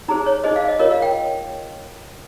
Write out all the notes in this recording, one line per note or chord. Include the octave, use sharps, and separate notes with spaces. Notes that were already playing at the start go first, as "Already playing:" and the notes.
D#4 G#4 C5 A#5
C#5
D#4 G#4 C5 D#5
F5
D#5
F4 A#4 C#5 D#5
F5
G5